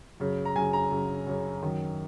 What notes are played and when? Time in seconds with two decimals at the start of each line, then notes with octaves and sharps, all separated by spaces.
0.20 F#2 C#3
0.45 A#5
0.55 F#2 C#3 G#5
0.73 A#5
0.91 F#2 C#3
1.27 F#2 C#3
1.62 F#2 D#3